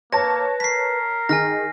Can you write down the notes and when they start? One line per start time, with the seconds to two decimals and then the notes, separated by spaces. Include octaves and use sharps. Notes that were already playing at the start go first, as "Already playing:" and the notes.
0.13 A#3 B4 C#5 A5 A#6
0.60 A#4 B6 C7
1.29 D#3 G#4 G#5 F6 A#6